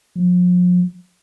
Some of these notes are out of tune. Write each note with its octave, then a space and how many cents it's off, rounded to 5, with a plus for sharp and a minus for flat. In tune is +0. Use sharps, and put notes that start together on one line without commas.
F3 +40